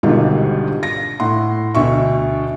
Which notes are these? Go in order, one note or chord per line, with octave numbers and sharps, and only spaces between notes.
G#1 G#2 B2 D3 G3 F4
A#6
A2 F#5 C6
D2 B2 E5 C#6